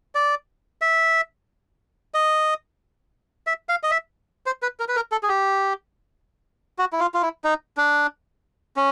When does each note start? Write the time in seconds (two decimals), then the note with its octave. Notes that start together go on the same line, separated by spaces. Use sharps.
0.15 D5
0.81 E5
2.14 D#5
3.47 E5
3.69 F5
3.83 D#5
3.91 E5
4.46 C5
4.62 B4
4.80 A#4
4.88 B4
4.96 A#4
5.12 A4
5.23 G#4
5.29 G4
6.78 F#4
6.93 E4
7.00 F4
7.14 F4
7.22 E4
7.44 D#4
7.77 D4
8.76 C#4